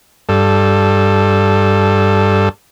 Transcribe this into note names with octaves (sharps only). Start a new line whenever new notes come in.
G2 A4